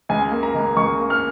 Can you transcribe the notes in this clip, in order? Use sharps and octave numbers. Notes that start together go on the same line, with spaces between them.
C#2 G#5
A#3
A#5
C#2
C#2 C#6
A#3
F6